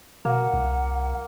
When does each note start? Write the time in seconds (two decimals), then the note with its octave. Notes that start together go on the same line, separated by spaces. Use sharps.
0.25 B2 A#3 F#5
0.53 C2